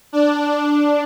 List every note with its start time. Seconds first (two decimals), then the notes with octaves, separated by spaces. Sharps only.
0.13 D4
0.51 D4